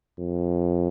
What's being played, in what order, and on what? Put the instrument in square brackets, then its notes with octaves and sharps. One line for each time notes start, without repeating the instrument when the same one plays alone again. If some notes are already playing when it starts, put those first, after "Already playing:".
[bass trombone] F2